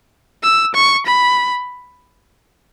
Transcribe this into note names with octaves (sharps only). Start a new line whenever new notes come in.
E6
C#6
B5